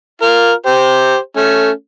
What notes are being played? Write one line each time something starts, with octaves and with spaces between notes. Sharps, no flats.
F4 A#4
G4 C5
A3 C#4